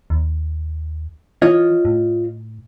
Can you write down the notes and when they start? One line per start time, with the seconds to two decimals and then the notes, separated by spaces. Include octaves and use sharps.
0.10 D#2
1.42 E3 F4 C#5 D#5
1.85 A2